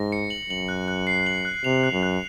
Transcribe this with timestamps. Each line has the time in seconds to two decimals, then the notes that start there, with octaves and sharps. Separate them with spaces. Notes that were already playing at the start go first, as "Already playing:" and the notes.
Already playing: G#2 A#6
0.12 C#7
0.30 F#7
0.50 F#2 F#7
0.69 F#6
0.88 F#6
1.07 C7
1.26 F#7
1.45 F#6
1.64 C3 F7
1.84 F#6
1.92 F#2
2.03 F#6